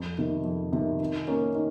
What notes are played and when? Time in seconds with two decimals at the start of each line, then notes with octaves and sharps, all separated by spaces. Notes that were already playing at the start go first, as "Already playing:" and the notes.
Already playing: F2
0.18 C3 D#3
0.45 F2
0.72 C3 D#3
1.01 D#3
1.27 A#3 C#4
1.55 D#3